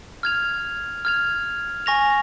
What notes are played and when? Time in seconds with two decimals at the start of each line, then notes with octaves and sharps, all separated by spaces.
0.23 F6 G#6 F7
1.05 F6 G#6 F7
1.86 G#5 C#6 A#6 F7